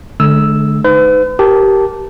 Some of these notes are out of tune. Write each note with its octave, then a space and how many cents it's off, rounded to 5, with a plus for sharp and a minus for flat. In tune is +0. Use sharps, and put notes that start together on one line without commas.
D3 +0 G#3 +40 E6 +0
D#4 +0 B4 +45
G4 -15 A#4 +0 A5 +0